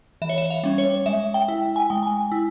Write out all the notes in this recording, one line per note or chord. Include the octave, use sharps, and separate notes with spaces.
E3 E5
C#5
E5
F5
G3 C#4
C#5
G#3 E5
G5
E4
G#5
G#3 G5
G#5
E4